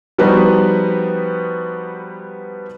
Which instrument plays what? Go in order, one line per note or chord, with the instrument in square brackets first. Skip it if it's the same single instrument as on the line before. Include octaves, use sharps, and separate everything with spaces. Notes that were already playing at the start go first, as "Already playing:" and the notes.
[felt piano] F3 G3 B3 D#4 F#4 B4